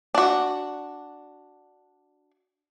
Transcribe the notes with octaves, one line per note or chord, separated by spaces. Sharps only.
D4 F#4